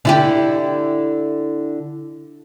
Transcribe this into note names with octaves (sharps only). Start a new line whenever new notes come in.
D3 E4 G4